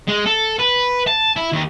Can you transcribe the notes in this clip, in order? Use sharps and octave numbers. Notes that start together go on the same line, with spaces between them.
G#3
A4
B4
A5
E4
D#2